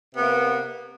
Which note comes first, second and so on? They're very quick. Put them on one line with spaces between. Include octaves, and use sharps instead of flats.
C3 B3 A#3